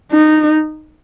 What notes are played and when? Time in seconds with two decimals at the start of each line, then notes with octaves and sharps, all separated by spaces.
0.12 D#4